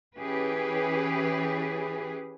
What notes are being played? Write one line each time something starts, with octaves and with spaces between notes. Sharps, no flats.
E3 C#4 G4 G#4 B4